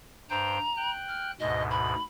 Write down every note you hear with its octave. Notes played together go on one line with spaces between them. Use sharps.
G2 C5 G5 A#5
G5 F#6
F6
D2 G#2 B2 D#5
B5